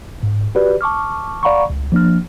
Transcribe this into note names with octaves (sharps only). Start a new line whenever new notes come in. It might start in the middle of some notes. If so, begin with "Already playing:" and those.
G#2
F#4 G4 B4 D5
A5 C#6 D6 F6
D5 F5 F#5 A#5 B5 C#6
C#2
F3 A#3 D4 F6